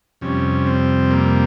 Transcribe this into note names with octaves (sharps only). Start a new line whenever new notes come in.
F2 C3 G3 C#4
C4
A#3